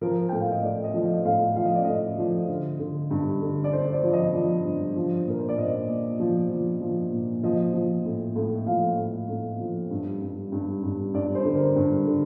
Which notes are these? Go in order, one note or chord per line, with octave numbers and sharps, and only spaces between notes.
F3 A#4
A2 G5
F5
D#5
A2 D5
D#5
F3
D#5
A2 F5
F3 F5
D#5
D5
A2 D#5
F3
D3
D3
G2
D3
D5
D3 C5
D5
F3
D#5
F3 D5
G2
F3
A#2 A#4
C5
D5
A#2 D#5
A#2
F3
F3
F3
A#2
F3 D#5
F3
A2
A2
F3 F5
A2
A2
F3
G2
G2
G2
G2
G2 D5
C5
D3
A#4
G2
D3